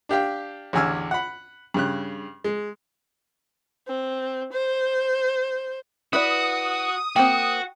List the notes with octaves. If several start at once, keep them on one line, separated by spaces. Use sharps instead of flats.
D4 G4 F5 G5
A1 E2 D3 G#5 E6 F6
F#5 B5
G2 C#3 F#6
G#3
C4
C5
E4 F#4 B4 D5 D#6
A#3 C4 F#4 G5